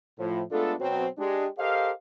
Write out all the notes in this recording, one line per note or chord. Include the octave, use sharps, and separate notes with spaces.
A2 F3
G#3 A3 B3 D4 F4 A4
B2 F#3 C4
G#3 D4 G4
G4 A4 A#4 C5 D#5 F5